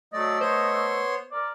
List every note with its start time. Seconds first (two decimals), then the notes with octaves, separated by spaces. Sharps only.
0.14 F#3 A3 D5 D#5
0.41 B3 C5 C#5 C6
1.32 A#4 D5